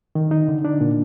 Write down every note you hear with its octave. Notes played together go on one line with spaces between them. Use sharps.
D#3
D#4
D3
D4
A#2